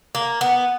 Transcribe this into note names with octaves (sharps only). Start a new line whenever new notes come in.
A#3
B3